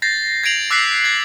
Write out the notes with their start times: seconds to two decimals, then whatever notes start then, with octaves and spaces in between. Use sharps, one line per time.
0.02 G6 A6 A#6 C7
0.43 G#6 A#6 C7 D7 F7 F#7
0.70 D6 E6 F#6 B6 C7
1.04 G#6 A6 F#7